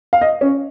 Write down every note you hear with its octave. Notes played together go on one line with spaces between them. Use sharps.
F5
D#5
C#4